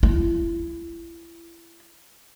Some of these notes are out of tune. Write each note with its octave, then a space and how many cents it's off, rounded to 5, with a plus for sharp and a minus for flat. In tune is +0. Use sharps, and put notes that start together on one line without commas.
E4 +35